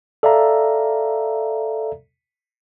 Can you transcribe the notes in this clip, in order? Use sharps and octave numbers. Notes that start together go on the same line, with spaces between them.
A4 D5 E5 F5 A#5